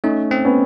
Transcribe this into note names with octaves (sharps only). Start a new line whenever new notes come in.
A3 C#4 D#4
C4
B3 C#4